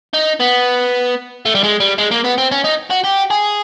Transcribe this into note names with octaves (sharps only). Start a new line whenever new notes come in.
D#4
B3
A3
G3
G#3
G3
G#3
A#3
B3
C4
C#4
D#4
F#4
G4
G#4